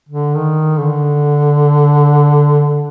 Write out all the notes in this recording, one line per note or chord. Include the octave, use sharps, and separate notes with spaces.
D3
D#3
D3